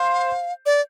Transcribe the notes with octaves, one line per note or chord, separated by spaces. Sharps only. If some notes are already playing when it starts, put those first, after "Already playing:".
Already playing: C5 F5
D5